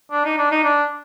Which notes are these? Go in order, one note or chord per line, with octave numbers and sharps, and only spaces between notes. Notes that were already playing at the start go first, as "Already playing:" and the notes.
D4
D#4
D4
D#4
D4